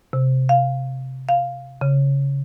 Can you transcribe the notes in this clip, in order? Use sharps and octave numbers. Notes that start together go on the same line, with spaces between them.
C3
F5
F5
C#3